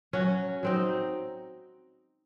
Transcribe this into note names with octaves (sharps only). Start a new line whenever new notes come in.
F#3 C#4 F#4
F#3 C4 D#4